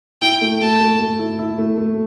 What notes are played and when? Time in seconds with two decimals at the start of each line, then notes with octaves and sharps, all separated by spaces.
0.22 E4 G5
0.41 A3
0.61 A3 A5
0.80 A3
0.99 A3
1.19 E4
1.39 E4
1.58 A3
1.78 A3